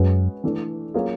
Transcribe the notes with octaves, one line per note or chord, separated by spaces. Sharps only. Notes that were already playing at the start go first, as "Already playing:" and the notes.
Already playing: F#2 G#3 C#4 F#4 B4
E3 A3 D4
F#3 A#3 C#4 F4 G#4